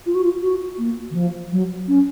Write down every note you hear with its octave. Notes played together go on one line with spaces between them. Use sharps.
F4
F#4
F4
F#4
A#3
D#3
F3
F#3
C#4